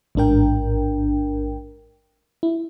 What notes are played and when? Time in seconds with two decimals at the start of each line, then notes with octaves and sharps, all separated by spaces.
0.15 A1 G#2 D4 A#4 G5
2.43 E4